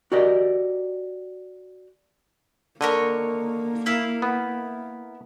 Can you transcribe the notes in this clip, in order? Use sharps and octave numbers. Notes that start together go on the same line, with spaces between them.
F#4 G4 A#4 D5 D#5
D3 A#3 A#4 C#5 D#5
E4 A#4 F5
B3